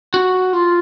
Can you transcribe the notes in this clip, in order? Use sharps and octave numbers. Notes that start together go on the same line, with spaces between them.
F#4
F4